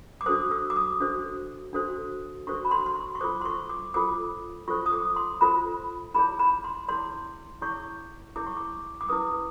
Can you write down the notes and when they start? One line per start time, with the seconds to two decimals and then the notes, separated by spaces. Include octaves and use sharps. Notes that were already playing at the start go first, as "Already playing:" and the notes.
0.21 D6
0.26 D4 F#4 A4 C5 D#6
0.51 E6
0.70 D6
0.76 D#6
1.00 D4 F#4 A4 C5
1.73 D4 F#4 A4 C5
2.47 D4 F#4 A4 C5 C#6
2.65 B5
2.71 C6
2.86 C6
2.96 C#6
3.15 C#6
3.21 F4 A4 C5 D6
3.41 C6
3.45 C#6
3.70 D6
3.94 F4 A4 C5 D6
4.68 F4 A4 C5 C#6
4.86 D#6
4.93 D6
5.16 C6
5.41 F4 A4 C5 B5
6.14 E4 G#4 C#5 B5
6.39 B5
6.64 C6
6.88 E4 G#4 C#5 C6
7.62 E4 G#4 C#5 C#6
8.36 E4 G#4 C#5 D6
8.47 C#6
8.57 D6
9.01 D6
9.09 E4 G#4 B4 D#6